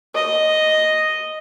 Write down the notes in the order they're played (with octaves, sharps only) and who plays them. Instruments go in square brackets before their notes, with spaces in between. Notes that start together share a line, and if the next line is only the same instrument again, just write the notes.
[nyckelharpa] D#5